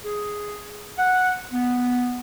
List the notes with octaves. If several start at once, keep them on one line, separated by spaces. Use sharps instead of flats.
G#4
F#5
B3